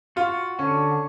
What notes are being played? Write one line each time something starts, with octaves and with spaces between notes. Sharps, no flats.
F4 F#4
D3 C#4